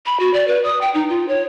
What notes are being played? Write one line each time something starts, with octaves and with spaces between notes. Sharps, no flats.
B5
F#4
D5
B4
D#6
G5
D#4
F4
C#5